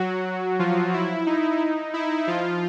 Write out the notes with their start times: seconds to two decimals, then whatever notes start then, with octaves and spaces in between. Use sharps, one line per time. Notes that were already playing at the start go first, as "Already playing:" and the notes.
Already playing: F#3 F#4
0.59 F3 F4
0.93 E4
1.26 D#4
1.94 E4
2.27 F3 F4